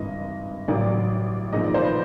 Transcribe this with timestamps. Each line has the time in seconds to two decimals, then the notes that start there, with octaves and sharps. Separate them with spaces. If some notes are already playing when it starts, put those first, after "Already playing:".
Already playing: G#1 G2 E3 D#5
0.68 A1 A2 F#3 D5
1.52 A#1 G#2 D#3 D#5
1.64 D5
1.74 C5
1.84 B4